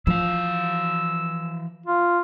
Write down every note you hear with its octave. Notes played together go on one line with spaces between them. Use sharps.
E3 F3 F5 E6
F4